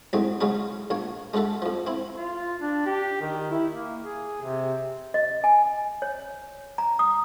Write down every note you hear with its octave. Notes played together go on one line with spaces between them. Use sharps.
A2 F#3 G#3 C4 D#4
C#3 F#3 G#3 C#4 D#4
A#1 A#3 C#5
G#3 C#4 F#4 A4 E5
F2 F3
C4 E4
F4
D4
G4
D#3
E4
A#3
G#4
C3
D#5
G#5
C#5
A#5
D#6